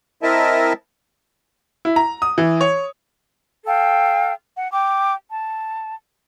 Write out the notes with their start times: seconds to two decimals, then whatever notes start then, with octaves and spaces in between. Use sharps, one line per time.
0.23 C4 E4 A#4 D#5 E5 A5
1.85 E4
1.96 A#5
2.22 D#6
2.38 E3
2.61 C#5
3.66 A4 F5 G5
4.56 F#5
4.72 G5 D6
5.30 A5